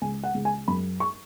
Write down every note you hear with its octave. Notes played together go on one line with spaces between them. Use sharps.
C#2 G#5
F#5
C#2
G#5
F#2 B5
C#6